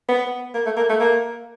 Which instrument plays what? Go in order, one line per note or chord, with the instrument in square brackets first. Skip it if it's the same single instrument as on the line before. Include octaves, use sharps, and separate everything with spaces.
[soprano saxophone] B3
A#3
A3
A#3
A3
A#3